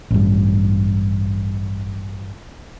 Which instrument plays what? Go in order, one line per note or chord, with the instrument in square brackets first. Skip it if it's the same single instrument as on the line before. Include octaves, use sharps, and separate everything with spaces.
[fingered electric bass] A1 G2